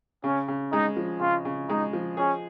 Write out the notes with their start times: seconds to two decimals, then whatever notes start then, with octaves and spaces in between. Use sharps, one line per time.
0.24 C#3 C#4
0.48 C#3
0.72 G#3 D#4
0.96 F3
1.20 C#3 F4
1.45 C#3
1.69 G#3 D#4
1.93 F3
2.17 C#4 G#4